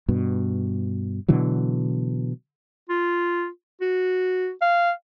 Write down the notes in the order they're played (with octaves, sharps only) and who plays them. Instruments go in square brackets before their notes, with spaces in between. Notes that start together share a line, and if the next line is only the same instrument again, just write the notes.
[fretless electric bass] G2 B2
B2 D3 E3 F#3
[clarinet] F4
F#4
F5